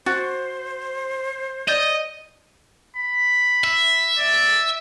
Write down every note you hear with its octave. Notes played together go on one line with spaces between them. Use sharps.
F#4 C5 A6
D5 D#5 G6 G7
B5
E5
D5